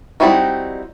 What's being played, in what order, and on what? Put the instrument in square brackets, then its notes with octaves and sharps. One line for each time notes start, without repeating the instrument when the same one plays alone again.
[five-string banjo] G3 C4 D#4 E4 F#4